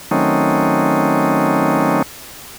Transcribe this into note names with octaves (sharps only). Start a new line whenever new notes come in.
D#3 F#3 A3 C4 C#4 D#4